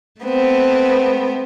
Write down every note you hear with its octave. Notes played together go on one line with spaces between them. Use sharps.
A3 B3 C4